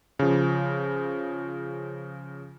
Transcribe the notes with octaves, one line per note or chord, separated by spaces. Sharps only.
C#3 F3